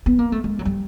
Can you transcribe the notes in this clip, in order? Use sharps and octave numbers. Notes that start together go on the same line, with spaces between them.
B3
A#3
A3
G#3
F#3
G3